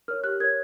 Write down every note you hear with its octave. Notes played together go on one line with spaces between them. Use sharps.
A#4 C#5 F6
G4 F#6
A#4 C#5 G#6